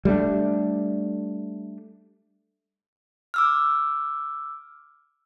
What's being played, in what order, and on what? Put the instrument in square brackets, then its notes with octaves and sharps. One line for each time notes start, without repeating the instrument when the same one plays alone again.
[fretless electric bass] G3 A3 B3 D4
[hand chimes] D6 E6 F6